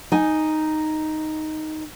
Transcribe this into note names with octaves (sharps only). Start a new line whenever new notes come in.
D#4 G#5